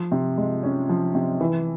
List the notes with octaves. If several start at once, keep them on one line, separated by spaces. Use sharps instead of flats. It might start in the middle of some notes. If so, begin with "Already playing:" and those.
Already playing: F3
C3
G#3
C#4
F3
C3
E3